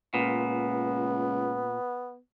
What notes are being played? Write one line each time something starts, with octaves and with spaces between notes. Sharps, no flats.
C#2 A#2 B3